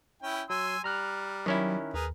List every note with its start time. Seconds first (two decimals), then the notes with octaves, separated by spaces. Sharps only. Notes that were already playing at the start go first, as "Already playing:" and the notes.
0.22 C#4 E4 G5
0.50 F#3 G#5 C6 E6
0.84 G3 A#5 F6 F#6
1.46 D#3 F#3 C#4 E4
1.94 D#2 G#4 A#4 B4